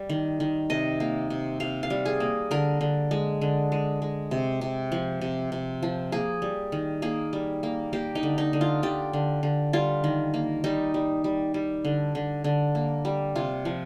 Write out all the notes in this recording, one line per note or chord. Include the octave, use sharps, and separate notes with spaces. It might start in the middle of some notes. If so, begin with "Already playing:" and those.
Already playing: G3
D#3
D#3
C3 D#5
A#3
C3
C3 F5
F5
G3
G#4
A#3
D3 A#4
D3
G#3
D3
G#3
G#3
C3
C3
F3
C3
C3
F3
A#3 G#4
G3
D#3
A#3 G#4
G3
A#3
A#3 G4
D#4
D3
D#4
D3
F4
D3 G4
D3
D3
G3 F4
D#3
A#3
G3 D#4
G3
G3
G3
D3
D3
D3
A#3
G3
C3 F4
F3